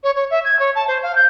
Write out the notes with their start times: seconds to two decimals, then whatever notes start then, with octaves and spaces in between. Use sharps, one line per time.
0.04 C#5
0.15 C#5
0.31 E5
0.45 G#6
0.59 C#5
0.75 A5
0.87 C5
1.03 F5
1.15 G6